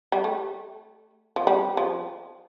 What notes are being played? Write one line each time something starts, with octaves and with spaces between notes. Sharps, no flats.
G3
A3
F3
G3
F3